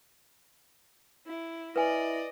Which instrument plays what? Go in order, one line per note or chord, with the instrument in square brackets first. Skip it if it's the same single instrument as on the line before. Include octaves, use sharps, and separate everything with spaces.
[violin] E4
[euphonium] E4 [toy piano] B4 G#5 [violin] D5 D#5